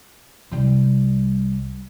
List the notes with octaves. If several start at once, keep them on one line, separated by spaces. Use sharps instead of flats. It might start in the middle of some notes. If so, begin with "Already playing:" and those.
C2 G3